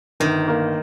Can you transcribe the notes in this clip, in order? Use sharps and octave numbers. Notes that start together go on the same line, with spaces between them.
G1 D#3
A#3